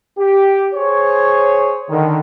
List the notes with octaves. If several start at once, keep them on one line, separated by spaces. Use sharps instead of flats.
G4
G#4 C5 C#5
D3 D#3